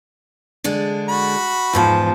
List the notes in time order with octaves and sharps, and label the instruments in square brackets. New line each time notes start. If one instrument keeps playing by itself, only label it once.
[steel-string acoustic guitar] D3 G#3 D4
[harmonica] F#4 B5
[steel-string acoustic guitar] E2 G#2 A4 [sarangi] F3